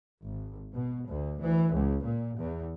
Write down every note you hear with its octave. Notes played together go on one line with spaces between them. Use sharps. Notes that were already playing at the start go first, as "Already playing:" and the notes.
G#1
B2
D2
E3
C#2
A#2
E2